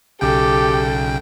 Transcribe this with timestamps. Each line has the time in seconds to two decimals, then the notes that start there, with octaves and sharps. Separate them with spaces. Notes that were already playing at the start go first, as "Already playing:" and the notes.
0.21 B1 C#3 G4 A4 G5